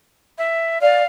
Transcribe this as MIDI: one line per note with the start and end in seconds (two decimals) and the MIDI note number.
0.38 0.81 76
0.81 1.02 74
0.81 1.06 77